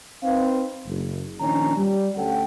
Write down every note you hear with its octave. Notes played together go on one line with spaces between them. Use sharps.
C4 D#4 B4 F5
F#1
A#2 D#3 F3 C#4 D4 A#5
G3
D2 C#4 A4 F#5 G5